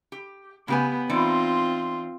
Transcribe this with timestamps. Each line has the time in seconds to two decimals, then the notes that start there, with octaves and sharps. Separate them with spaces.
0.12 G4
0.68 C#3 B3 G4 G#5
1.10 E3 C4 D#4 F4 D5